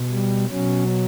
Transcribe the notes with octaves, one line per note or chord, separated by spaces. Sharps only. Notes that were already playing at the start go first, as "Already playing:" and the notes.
Already playing: B2
G3
B2 F#3 C#4